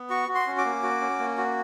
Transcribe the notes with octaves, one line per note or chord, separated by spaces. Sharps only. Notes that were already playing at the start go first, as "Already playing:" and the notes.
Already playing: B3
F#4 C#6
F#4
C6
C#4
D6
A#3
F#4
C#4
A#3
F#4